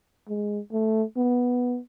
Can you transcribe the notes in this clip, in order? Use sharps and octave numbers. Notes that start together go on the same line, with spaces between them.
G#3
A3
B3